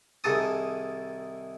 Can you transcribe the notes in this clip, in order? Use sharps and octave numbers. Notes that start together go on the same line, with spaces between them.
C2 D#3 G#4 A4 A5 D#6